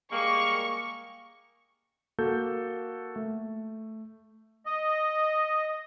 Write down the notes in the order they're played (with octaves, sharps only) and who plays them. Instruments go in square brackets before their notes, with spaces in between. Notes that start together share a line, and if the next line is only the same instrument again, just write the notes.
[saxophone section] G3 G#3 A#3 [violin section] C#6
[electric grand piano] A#3 F#4 A4 G6
A3
[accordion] D#5